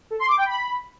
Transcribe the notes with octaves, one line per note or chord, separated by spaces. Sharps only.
A4
C6
D6
G5
B5